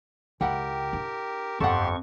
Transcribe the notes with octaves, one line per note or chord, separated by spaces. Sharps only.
C#2 E4 G4 A#4 F#5 G5
D4
G1 F2 G4 A4 F#5 C6 C#6